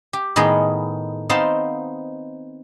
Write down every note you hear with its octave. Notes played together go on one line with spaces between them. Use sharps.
G4
A2 D#3 B3 D#4 G#4
B3 C4 D#4 C5 F5 A5